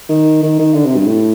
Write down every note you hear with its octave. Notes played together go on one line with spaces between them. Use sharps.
D#3
D#3
D#3
D3
C3
G2
A2